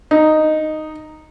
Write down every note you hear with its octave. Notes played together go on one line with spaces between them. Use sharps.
D#4